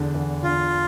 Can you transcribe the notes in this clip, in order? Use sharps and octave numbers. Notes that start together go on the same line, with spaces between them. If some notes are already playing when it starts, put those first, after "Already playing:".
Already playing: E2 D3
E2
D3 F4